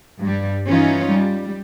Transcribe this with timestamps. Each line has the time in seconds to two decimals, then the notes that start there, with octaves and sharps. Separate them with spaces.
0.20 G2 G3
0.66 E3 C#4 D#4 F4
1.11 G3